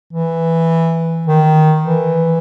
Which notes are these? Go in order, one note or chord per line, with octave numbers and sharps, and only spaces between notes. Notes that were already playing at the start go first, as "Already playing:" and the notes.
E3
D#3
E3